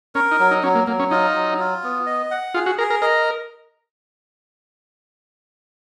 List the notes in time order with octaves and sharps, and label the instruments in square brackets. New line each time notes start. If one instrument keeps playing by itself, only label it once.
[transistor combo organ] C#4 [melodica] A#4
[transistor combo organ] D#4
[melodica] F#3
[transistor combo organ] D#4
[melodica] F#3 [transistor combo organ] C#4
[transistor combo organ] A#3
[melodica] F#3 [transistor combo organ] A#3
[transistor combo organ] C#4
[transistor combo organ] D#4 [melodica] F4
[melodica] F#3
F4
B3
D#5
F#5
[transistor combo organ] F4 [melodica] G#4
[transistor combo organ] F#4
[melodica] G#4 [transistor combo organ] A#4
[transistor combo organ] A#4
[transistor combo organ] A#4 [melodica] D#5